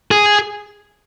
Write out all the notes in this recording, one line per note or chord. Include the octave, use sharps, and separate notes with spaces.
G#4